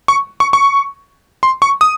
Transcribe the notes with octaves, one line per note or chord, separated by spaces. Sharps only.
C#6
C#6
C#6
C6
C#6
D#6